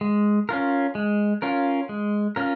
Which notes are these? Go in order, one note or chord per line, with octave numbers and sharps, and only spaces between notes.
G#3
C#4 F4 A#4
G#3
C#4 F4 A#4
G#3
C#4 F4 A#4